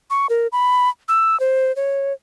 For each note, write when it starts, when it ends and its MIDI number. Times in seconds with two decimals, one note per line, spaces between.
0.10 0.27 85
0.30 0.47 70
0.52 0.89 83
1.08 1.39 88
1.40 1.74 72
1.76 2.13 73